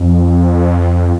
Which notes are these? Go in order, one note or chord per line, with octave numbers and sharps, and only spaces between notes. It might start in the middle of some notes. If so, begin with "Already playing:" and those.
Already playing: F2